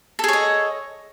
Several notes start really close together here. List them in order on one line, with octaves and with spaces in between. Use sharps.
A4 G#4 C#5 D#5